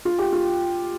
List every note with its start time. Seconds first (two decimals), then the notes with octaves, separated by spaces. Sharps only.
0.05 F4
0.18 G4
0.33 F4